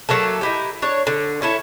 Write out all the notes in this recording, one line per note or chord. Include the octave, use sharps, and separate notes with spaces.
F#3 A3 A#3 A4
D#4 E4 G4
D4 C#5
D3
C#4 E4 A4